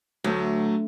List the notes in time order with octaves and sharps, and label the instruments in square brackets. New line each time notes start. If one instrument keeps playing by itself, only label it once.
[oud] D2 [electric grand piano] F#3 A3